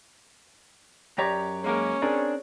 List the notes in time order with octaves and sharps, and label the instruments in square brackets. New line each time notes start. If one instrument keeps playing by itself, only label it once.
[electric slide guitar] F#2 A#5 [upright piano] G4 C#5 D5
[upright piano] G#3 A#3 A#4 [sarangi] C#4
[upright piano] C4 G#4 A#4 [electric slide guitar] D4